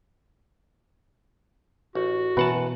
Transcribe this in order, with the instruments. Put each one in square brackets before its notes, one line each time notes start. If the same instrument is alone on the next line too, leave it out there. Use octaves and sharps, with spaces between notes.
[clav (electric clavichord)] A1 [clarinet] F#4
[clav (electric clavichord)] F#2 F#5 A5 [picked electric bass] B2 E3 [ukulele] B4